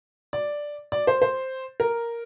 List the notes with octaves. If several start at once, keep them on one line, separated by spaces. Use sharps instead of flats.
D5
D5
C5
C5
A#4